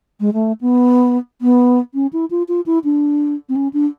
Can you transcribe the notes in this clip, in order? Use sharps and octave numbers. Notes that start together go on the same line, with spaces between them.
G#3
A3
B3
B3
C#4
E4
F4
F4
E4
D4
C4
C#4
D4